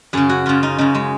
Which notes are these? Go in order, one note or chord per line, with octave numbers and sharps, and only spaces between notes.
F#2 C#3 G#4
F#4
F#2 C#3 F4
D#4
F#2 C#3 D#4
G#3